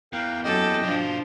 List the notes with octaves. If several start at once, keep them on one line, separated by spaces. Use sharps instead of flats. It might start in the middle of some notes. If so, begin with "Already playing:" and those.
E2 A#4 F5 G5
F#2 G4 A4 D#5 G5
B2 F3 D4 F4